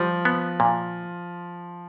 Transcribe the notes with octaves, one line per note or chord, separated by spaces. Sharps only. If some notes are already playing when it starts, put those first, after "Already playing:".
Already playing: F3 G3
B3
A#2